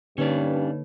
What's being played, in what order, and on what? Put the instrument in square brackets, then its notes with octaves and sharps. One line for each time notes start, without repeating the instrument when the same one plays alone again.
[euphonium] G2 [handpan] D3 A#3 [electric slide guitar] C#4 D5 [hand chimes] D#4 B4 C#5